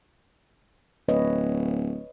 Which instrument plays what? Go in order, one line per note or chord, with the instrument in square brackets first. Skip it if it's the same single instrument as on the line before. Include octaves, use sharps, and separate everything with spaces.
[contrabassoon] D1 [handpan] B4 C#5 D#5